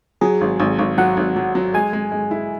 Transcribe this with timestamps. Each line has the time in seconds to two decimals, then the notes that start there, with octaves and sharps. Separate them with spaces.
0.21 F#3 G#4
0.41 G#1
0.60 G#1
0.79 G#1
0.98 F#3 F#5
1.17 G#1
1.36 F#3
1.55 F#3
1.74 G#3 G#5
1.93 G#3
2.12 G#3
2.31 E4